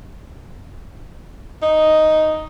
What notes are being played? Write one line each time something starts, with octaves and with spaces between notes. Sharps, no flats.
D#4